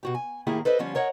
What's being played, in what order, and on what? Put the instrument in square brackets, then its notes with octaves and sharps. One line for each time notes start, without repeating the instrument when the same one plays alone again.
[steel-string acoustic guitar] B2 F#4 G4
G#5
A2 D#3 A#3 E4 G4 G#4
A4 B4 C5 D#5 E5
D3 F3 G3 C#4 F4
A#4 C#5 D#5 F#5